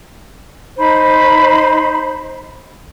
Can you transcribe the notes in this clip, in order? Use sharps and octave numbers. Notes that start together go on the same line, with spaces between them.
D#4 C5 B5